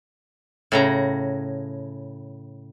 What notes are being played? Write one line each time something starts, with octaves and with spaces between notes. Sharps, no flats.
A2 C#3 A#5